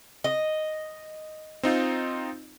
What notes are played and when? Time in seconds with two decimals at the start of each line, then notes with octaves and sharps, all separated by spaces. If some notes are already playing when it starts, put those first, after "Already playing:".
0.24 D#5
1.63 C4 D#4 F4